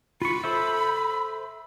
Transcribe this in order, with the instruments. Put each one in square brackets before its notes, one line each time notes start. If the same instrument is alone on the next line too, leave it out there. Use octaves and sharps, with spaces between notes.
[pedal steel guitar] F4 C#6 [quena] B5
[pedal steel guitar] A4 C5 E5